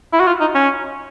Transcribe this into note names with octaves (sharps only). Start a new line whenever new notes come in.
E4
F#4
F4
D#4
C#4